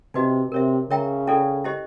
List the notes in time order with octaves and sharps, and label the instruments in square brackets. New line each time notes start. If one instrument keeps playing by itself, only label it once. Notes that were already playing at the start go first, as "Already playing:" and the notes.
[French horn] C3 [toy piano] D#4 F#4 B4 D#5
[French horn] C3 [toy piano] A#4 C#5 E5
[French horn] C#3 [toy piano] A#4 C#5 E5 G5 A#5
[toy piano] C#4 E4 A4 D5
E4 G4 C5 D#5